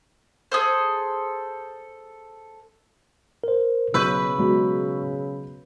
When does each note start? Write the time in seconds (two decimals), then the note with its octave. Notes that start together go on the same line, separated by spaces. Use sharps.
0.52 G#4 A4 C5
3.44 A#4 C5
3.94 B1 C#3 B4 C#6 E6 G6 D#7
4.38 B2 F#3 G#3